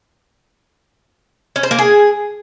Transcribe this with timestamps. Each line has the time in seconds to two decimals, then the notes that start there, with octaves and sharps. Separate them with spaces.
1.56 C#4
1.63 C5
1.71 A#3
1.79 G#4